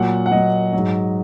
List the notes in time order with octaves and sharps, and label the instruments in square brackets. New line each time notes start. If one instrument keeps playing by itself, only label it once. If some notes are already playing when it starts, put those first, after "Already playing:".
Already playing: [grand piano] A#2 F#3 F#5
F#5
A#2 F#3 D#5
G#2 F#3